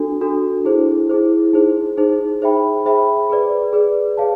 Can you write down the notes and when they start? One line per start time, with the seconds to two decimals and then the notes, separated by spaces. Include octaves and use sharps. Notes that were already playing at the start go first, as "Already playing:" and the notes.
Already playing: D4 F#4 A4
0.21 D4 F#4 A4
0.65 E4 G#4 C5
1.09 E4 G#4 C5
1.53 D#4 G#4 C5
1.97 D#4 G#4 C5
2.42 G#4 C5 E5 G5 B5
2.86 G#4 C5 E5 G5 B5
3.30 G#4 B4 D5
3.73 G#4 B4 D5
4.17 G#4 C#5 F5 A5